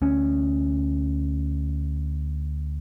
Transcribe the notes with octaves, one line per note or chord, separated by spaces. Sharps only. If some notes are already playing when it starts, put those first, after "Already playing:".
D2 C#4